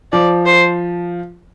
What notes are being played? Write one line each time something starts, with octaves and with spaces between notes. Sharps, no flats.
F3 D5
C5